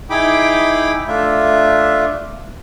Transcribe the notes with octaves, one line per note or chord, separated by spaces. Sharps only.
D#4 E4 G#4 G5 B5 D6
A3 D4 F4 E5